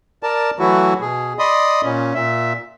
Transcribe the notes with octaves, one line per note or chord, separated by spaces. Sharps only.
A#4 D5 A5
E3 F#3 A3 E4 F#4
B2 G#4
D5 D#5 B5 C6 D#6
A#2 C#4
A#2 E5